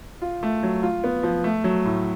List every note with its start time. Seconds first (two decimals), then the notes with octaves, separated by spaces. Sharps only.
0.22 F4
0.43 A3
0.63 F#3
0.83 F4
1.04 B3
1.23 F3
1.44 A3
1.64 F#3
1.85 A2